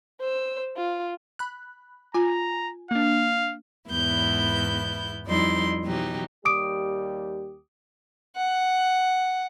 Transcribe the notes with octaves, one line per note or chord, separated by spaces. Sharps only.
C5 E6
F4
B5 F#6
F4 G#5 A#5
A#3 D4 F5
E2 G#2 B3 E4 G6
F2 G3 D#4 E4 D5 C6
B2 E3 F#3 D#4 G4
D#2 G3 G4 D6 D#6 D7
F#5